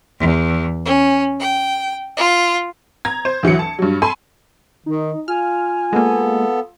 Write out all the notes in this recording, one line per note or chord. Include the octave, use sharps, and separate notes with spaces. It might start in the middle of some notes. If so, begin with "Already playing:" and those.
E2
C#4
G5
F4
A#5 G#6
C5
D2 E3 F#3 C#7
A5
G2 F#3
A4 G#5 B5 C6
D#3 D#4
F4 G#5 F6
G#3 A#3 B3 A4